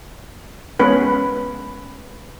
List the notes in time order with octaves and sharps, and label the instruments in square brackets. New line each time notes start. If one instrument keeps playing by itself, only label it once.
[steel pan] G#3 B3 C#4 B4